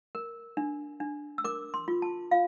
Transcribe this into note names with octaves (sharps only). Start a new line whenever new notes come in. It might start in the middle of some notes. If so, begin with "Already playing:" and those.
A#4
D4
D4
E6
A#4 D6
C6
F4
A5
F4 F5